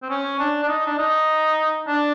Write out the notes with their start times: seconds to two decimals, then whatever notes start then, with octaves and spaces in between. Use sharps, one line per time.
0.02 C4
0.10 C#4
0.39 D4
0.63 D4
0.68 D#4
0.87 D4
0.98 D#4
1.87 D4